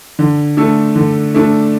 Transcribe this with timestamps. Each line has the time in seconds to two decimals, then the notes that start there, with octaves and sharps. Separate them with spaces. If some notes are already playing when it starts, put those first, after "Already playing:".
0.19 D3
0.57 A3 D4 A4
0.95 D3
1.34 A3 D4 A4